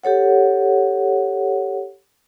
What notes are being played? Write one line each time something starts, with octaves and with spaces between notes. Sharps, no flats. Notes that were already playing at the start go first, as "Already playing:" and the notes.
G4 A4 C#5 F#5